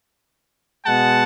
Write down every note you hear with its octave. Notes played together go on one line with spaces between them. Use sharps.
B2 G#3 F#5 A5